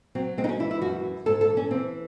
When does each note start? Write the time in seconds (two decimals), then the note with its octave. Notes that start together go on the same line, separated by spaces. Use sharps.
0.15 F#3 C4
0.38 G#3 C4
0.44 D#4
0.49 C#4
0.59 E3 E4
0.71 E4
0.81 F#2 F#4
1.05 F#2
1.26 G#2 A4
1.41 A4
1.50 E3
1.57 C#4
1.71 E3 C4